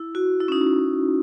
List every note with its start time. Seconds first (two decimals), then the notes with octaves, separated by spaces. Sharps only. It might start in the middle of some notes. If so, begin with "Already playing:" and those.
Already playing: E4
0.15 F#4
0.40 E4
0.48 C#4
0.52 D#4